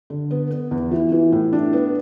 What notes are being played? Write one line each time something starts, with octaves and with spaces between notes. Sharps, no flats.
D3
B3
B3
E2
E3
E3
A2
D4
B3